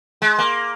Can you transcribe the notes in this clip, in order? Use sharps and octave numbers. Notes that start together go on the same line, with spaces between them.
G#3
A#3